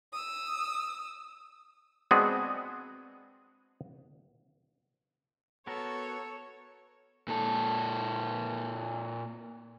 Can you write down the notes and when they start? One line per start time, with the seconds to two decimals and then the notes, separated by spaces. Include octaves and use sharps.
0.14 D#6 E6
2.11 G#3 B3 C4 D4 F#4 G#4
5.67 B3 F#4 A4 A#4 C#5
7.28 A#2 A4